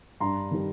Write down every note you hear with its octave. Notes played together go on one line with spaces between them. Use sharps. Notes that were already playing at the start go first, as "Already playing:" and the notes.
G2 A#5 C6
D#3 G3